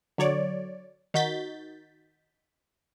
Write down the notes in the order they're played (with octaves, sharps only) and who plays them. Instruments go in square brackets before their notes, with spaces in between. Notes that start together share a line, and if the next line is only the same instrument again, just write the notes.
[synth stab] D3 F#3 C#5 D5
D#3 D#4 F#4 G6 A6 B6